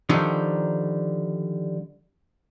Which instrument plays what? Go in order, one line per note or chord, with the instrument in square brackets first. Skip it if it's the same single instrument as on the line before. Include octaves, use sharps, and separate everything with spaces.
[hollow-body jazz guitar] D3 D#3 F3 G3 D4 D#4